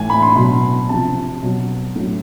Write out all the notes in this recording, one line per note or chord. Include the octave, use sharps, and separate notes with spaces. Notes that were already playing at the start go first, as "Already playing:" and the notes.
Already playing: A2 E3 G#5
B5
C6
B2 F#3 B5
C3 F3 A5
B2 F#3
A2 F#3